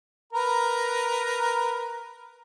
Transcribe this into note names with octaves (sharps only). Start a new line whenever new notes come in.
A#4 B4 A#5